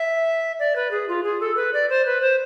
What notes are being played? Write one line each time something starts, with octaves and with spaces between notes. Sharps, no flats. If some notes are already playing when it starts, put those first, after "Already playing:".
Already playing: E5
D5
B4
G#4
F4
G#4
A4
B4
D5
C5
B4
C5